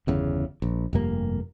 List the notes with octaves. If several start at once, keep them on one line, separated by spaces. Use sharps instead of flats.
G1 E2 C#3
A#1
F1 G2 A#3